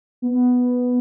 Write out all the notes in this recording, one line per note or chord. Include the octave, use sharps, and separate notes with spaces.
B3